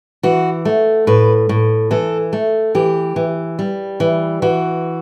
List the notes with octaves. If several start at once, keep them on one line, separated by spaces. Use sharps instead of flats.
E3 F#4
A3
A2 B4
A2
E3 A4
A3
E3 G4
E3
G3
E3
E3 F#4